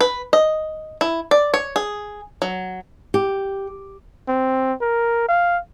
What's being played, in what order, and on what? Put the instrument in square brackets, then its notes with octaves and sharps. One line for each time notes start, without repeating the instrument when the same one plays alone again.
[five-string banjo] B4
D#5
E4
D5
C#5
G#4
F#3
[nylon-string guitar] G4
[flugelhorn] C4
A#4
F5